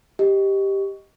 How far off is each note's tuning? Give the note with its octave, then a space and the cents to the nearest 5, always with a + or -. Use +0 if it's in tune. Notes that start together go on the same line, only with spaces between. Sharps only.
G4 +0 D#5 +0